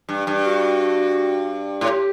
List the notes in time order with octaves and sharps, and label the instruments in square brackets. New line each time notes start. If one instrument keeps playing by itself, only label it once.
[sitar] G2
G2
[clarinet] F#4
[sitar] A2
[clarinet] G4